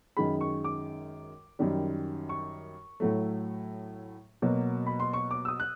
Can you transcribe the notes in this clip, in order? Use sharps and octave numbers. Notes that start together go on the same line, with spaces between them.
F#2 D#3 G#3 B5
C#6
D6
F#2 D#3 G3
C#6
A2 F#3 A3
B2 F#3 A#3
B5
C6
C#6
D6
E6
D#6
F#6